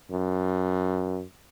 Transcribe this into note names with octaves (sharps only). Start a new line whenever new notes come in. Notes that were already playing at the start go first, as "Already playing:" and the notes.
F#2